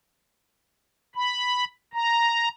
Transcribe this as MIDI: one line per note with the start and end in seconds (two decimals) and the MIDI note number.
1.16 1.64 83
1.94 2.48 82